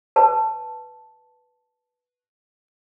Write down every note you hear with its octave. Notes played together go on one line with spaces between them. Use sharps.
B4 A5